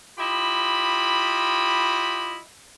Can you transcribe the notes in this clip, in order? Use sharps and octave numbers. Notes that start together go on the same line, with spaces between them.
E4 F4 G4 D#5 B5